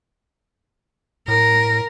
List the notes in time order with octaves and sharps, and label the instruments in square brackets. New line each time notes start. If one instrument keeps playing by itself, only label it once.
[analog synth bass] A2 [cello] A#4